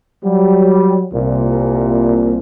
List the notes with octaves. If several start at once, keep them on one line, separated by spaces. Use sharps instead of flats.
F#3 G3
C2 A#2